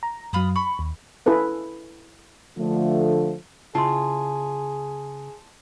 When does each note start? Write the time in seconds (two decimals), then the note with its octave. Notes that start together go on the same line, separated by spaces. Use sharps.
0.03 A#5
0.33 F#2 F#3 F4 B5 D#6
0.56 B5 C#6
0.79 D#2
1.26 E4 G#4 A4 B4 F5
2.58 D3 F3 A3
3.75 C#3 E4 F4 G#4 A5 C6